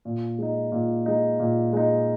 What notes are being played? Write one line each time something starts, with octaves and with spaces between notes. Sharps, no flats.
A#2
G#3 D#4
A#2
G#3 D#4
A#2
G#3 D#4